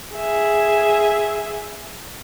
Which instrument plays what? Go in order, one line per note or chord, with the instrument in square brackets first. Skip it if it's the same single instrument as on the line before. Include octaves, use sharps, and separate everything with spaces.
[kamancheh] G#4 E5